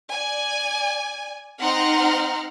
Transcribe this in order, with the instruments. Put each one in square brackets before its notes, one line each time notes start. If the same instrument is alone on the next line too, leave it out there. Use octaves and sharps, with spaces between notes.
[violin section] D5 G#5
C4 D#4 F#5 A#5 C6 F6